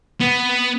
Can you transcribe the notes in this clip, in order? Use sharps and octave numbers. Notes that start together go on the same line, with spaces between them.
B3